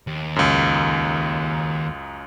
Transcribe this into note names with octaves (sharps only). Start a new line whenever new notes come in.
D#2
C#2 F#2